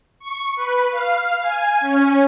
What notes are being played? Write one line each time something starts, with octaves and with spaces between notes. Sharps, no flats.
C#6
B4
F5
G#5
C#4